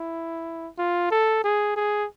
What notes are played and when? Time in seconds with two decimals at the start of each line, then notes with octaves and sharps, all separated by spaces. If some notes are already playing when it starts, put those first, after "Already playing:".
Already playing: E4
0.78 F4
1.11 A4
1.44 G#4
1.76 G#4